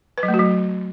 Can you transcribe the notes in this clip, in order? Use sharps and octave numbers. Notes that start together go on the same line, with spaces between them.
B4
F#3
A3
F#4
F#3